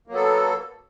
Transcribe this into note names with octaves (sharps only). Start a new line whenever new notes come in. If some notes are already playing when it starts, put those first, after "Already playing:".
F#3 A#3 B3 A4